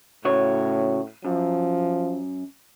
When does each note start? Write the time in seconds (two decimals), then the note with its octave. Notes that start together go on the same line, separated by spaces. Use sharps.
0.25 A2 C#3 F#4 C#5
1.25 F#2 F3